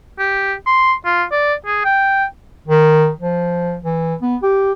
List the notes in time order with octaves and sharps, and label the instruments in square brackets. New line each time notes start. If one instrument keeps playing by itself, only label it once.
[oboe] G4
C6
F4
D5
G#4
G5
[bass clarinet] D#3
F3
E3
B3
G4